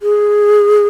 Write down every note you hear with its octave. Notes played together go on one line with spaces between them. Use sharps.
G#4